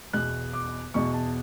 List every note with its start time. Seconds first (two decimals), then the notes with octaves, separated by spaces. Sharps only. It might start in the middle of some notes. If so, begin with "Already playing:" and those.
0.13 E2 B2 F#6
0.53 D6
0.94 E2 B2 C#6
1.14 A5